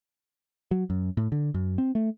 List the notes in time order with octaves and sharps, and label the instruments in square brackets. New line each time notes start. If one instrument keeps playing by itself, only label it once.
[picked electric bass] F#3
F#2
A2
D3
F#2
C4
A3